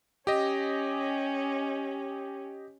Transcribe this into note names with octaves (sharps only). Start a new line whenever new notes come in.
C#4 G4 D#5